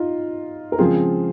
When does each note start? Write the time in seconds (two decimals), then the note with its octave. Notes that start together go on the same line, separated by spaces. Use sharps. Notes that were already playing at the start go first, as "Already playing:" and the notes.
Already playing: D#4 F4
0.72 A#4
0.78 C#3 F3 G#3 C4 F4 G#4